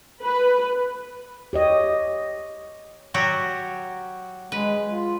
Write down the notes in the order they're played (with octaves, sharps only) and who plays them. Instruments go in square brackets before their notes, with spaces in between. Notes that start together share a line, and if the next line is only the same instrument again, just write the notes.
[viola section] B4
[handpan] G4 C#5 D#5
[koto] F#3 F#4 G4
[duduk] G#3 [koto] B4
[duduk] F4